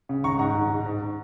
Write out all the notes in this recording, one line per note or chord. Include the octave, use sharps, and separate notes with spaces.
C#3
G#1 A#5 C#6
G#2 F#5 A#5
G#2
G#2
G#2